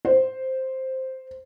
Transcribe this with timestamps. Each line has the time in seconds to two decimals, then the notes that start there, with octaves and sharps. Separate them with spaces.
0.05 C5